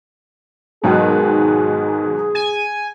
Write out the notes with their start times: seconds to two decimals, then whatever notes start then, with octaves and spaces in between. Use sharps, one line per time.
0.84 G#2 B2 D#3 F#3 G#4
2.35 G#5